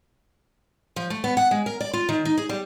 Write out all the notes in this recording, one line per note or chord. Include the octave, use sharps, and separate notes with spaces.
F3
A3
B3
F#5
G#3
A#4
D5
F4
D#3
D#4
G#4
G3